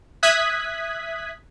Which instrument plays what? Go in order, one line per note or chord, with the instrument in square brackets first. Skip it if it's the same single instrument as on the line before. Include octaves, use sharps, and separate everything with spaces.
[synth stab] E5 D#6 F#6 G#6 B6